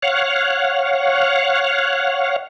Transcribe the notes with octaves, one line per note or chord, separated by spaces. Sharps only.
C#5 F5 F#5